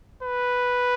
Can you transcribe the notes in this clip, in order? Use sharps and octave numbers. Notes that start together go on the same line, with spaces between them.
B4